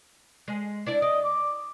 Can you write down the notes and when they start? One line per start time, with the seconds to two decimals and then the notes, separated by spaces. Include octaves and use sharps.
0.48 G#3
0.86 D4 E4 D5
1.02 D5 D#5
1.24 D6